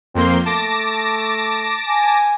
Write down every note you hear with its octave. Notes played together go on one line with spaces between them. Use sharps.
F2 A#3 C4 C6
A3 A5 D6 A#6
G#5